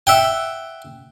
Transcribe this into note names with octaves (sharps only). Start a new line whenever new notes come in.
E5 F#5 G5